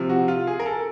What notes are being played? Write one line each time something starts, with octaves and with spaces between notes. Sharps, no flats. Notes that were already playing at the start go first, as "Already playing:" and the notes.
Already playing: C3 F3
F#4
F4
G#4
A#4
A4